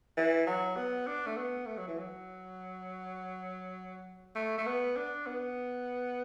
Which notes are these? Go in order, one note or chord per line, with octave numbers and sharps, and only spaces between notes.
E3
F#3
B3
D4
A3
B3
A3
F#3
E3
F#3
A3
A3
B3
D4
B3